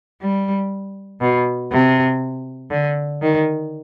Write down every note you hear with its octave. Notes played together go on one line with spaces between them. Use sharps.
G3
B2
C3
D3
D#3